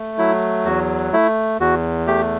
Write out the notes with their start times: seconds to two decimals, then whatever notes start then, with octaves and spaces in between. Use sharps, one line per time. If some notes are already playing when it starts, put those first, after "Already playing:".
Already playing: A3
0.18 F#3 E4
0.65 E2 F#4
1.13 A3 E4
1.60 E2 F#4
2.07 A3 G4